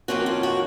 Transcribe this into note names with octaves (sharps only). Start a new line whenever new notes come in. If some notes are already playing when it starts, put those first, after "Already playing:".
F2 D#3 A#3 C#4 F4 F#4
F4
F#4